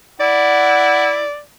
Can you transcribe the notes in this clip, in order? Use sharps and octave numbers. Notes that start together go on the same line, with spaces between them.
E4 D5 F#5